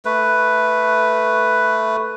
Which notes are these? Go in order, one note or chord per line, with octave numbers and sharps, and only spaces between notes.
A3 B4